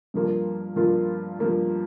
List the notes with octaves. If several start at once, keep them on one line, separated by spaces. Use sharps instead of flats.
G2 F3 A#3 F4
G2 F3 A#3 F4
G2 F3 A#3 F4